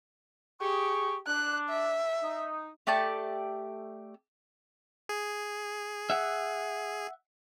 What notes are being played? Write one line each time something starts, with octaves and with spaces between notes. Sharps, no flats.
G4 G#4 C#6
D4 F#6
E5
D#4
A3 G4 D5 A5
G#4
E5 F#5